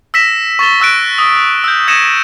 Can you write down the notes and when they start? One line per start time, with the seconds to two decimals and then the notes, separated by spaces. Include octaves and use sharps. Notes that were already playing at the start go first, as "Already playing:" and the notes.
0.14 E6 A#6 B6 E7
0.59 C#6 A6 E7 G7
0.80 C#6 E6 F#6 D7
1.18 D#6
1.64 E6 G6
1.88 D#6 G#6 A#6 C#7 D#7 E7